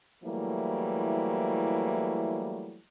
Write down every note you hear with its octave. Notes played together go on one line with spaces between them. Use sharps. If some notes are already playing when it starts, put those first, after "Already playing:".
E3 F#3 G3 A3 A#3 E4